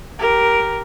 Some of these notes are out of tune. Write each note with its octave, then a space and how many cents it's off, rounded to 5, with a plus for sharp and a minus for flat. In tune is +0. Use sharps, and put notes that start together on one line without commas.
G4 -5 A#4 +0